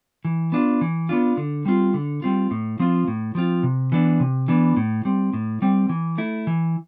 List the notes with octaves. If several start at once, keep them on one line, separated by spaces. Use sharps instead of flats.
E3
B3 D4 F4
E3
B3 D4 F4
D3
G3 C4 F4
D3
G3 C4 F4
A2
F3 C4 F4
A2
F3 C4 F4
C3
E3 B3 D4
C3
E3 B3 D4
A2
G3 C4
A2
G3 C4
E3
A3 E4
E3